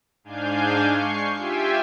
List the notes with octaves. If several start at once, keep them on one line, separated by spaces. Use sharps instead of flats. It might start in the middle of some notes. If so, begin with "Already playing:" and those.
G#2 D4 F5 G#5 G6
C#6 C7
F4 G4 E5 G5 G#5